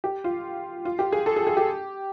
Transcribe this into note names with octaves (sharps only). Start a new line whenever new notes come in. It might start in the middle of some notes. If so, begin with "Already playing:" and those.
G4
F4
F4
G4
G#4
A4
G#4
G#4
G4